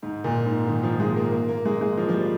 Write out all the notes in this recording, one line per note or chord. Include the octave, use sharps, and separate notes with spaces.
G#2
A#2
G#2
D#3
F3
G#3
A#3
A#3
A#3
G#3
G#3
F3
F3
G3